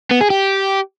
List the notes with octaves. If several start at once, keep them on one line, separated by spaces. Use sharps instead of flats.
B3
G#4
G4